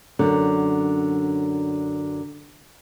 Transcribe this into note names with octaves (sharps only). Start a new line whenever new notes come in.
F#2 D3